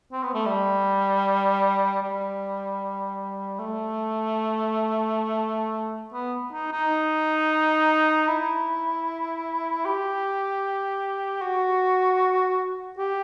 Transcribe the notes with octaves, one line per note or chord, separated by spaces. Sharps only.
C4
B3
A3
G3
G3
A3
B3
D#4
D#4
E4
G4
F#4
G4